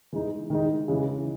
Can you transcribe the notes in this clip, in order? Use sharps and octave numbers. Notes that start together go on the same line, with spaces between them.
E3 G#3 D#4
D#3 G#3 D#4
C#3 E3 G#3